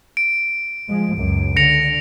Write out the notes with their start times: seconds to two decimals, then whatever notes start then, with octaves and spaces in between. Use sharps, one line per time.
0.17 D7
0.89 F3 G#3
1.17 C#2 F#2
1.56 D3 A#6 C#7 F7